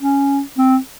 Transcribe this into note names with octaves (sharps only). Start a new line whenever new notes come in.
C#4
C4